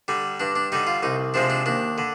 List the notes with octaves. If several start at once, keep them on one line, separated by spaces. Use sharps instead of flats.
D3 G3
G2 D4
D4
D3 G3 D#4
F4
C2 D#4
C3 F3 G#3 D4
D4
D#2 D4
D3